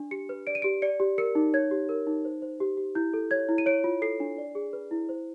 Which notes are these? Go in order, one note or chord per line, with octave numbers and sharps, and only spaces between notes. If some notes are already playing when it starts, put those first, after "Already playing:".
Already playing: D4
G4 C#7
B4
D5 D7
D#7
G4 D7
D5 C#7
G4
A#4 C#7
D#4
C#5 G#6
G4
A#4
D#4
C5
C5
G4
G4
E4 G6
A4
C#5 G#6
E4
D#7
C#5 D7
F4
A4 C7
D4
D5
G#4
B4
E4
C5